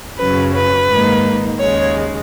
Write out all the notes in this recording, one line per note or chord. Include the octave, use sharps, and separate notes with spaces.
F#2 C#3 F#3 C#4 B4
B4
G#2 D#3 A#3 D#4
D#2 C#3 G#3 C#5